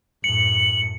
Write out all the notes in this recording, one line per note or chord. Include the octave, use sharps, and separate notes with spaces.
F#2 A2 C#7 F#7